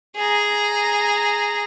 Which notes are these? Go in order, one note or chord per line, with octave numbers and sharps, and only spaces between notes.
G#4 A#5